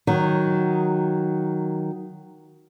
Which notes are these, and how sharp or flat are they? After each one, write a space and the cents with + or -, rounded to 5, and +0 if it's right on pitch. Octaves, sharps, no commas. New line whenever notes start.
D#3 +0 F#3 +0